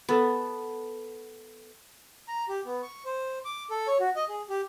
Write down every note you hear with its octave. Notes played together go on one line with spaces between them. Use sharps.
B3 A4 B5
A#5
G4
B3
C#6
C5
D6
A4
C#5
F#4
D#5
G#4
G4